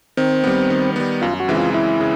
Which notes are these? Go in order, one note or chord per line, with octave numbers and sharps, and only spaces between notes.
D#3 C4
G3 B3
D#3
G3 B3
F#2 F4
F#4
C#3 E3 G#3 C4 E4
F4
F#2 E4
C#3